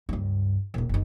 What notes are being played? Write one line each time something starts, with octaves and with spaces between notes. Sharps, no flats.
C#2 G2
D#1 C#2
F#1 D#4